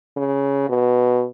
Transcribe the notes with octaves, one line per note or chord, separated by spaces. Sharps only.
C#3
B2